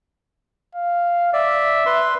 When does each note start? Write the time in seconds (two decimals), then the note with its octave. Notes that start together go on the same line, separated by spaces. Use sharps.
0.75 F5
1.33 D5 E5
1.86 B4 C6